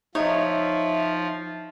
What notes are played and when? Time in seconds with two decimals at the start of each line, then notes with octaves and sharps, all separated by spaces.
0.15 F3 D#4 C#5 E5